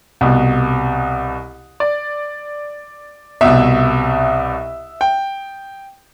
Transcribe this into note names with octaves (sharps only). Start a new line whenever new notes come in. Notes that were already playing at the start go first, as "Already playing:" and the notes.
C2 B2
D5
C2 B2 E5
G5